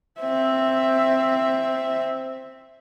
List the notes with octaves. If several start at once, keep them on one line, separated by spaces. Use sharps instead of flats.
C4 E5